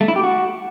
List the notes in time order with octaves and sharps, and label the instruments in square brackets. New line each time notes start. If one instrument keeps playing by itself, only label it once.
[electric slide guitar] A3
E4
G4
F#4